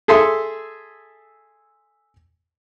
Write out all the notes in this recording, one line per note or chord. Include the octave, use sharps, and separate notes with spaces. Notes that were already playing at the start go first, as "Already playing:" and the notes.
G#4 A4 E5 C6